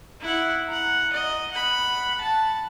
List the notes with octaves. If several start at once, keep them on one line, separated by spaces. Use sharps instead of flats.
E4 F#5
F#5 A#5
D#5
F#5 B5
A5